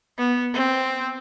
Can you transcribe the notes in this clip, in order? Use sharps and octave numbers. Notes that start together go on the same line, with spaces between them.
B3
C4